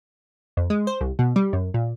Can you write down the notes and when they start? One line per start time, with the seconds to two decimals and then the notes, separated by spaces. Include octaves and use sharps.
0.57 F2
0.70 G#3
0.87 C5
1.01 C2
1.19 B2
1.36 G3
1.53 F#2
1.74 A#2